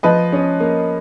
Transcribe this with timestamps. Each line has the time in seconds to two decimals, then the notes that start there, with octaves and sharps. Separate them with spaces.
0.03 F3 B4 D#5
0.33 C#4
0.60 A#3